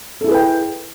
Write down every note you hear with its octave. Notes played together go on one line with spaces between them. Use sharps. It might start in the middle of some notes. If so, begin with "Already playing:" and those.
E4 G#4 A4 B4 G5